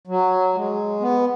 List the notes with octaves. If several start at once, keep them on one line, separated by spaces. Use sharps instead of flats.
F#3
G#3
B3